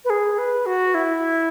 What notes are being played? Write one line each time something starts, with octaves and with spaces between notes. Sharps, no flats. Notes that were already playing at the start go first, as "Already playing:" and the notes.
B4
G#4
B4
F#4
E4